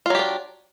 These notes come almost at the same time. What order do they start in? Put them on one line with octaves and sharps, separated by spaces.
F4 F#3 G4 D4